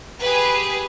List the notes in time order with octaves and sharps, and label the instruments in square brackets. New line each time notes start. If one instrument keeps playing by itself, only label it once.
[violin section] G4 G#4 B4